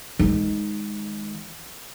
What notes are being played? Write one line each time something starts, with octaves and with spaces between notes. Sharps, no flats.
D#3 G#3